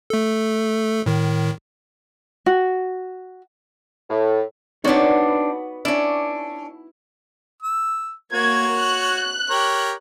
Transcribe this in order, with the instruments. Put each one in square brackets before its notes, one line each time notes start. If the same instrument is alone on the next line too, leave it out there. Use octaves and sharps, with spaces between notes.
[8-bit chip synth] A3 A4
A2 D#3
[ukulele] F#4
[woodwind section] A2
[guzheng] B3 F#4 [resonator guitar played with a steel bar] C4 D4 [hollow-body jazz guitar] D#4 C#5 D5
[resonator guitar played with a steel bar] C#4 D4 [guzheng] E4
[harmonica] E6
[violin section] A#3 G#6 [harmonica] F#4 C#5
[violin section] F#6
[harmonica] G4 A#4 C#5